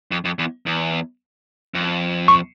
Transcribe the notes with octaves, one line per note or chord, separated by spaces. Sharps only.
F2
F2
E2
E2
F2
C#6